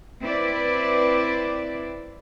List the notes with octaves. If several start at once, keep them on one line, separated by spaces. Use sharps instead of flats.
C4 E4 B4 D5